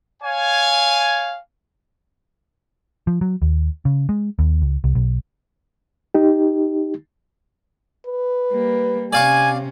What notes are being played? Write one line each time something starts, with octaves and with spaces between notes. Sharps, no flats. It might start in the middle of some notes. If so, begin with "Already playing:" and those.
C#5 F5 G#5
F3
F#3
D#2
C#3
G#3
D#2
C#2
C2
B1
D#4 G4
B4
G3 A#3
C3 C#4 D5 F5 G#5 C#6